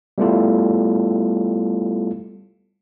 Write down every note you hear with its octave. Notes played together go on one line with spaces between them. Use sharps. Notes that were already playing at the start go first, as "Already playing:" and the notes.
G3 A3 B3 E4 F4 A4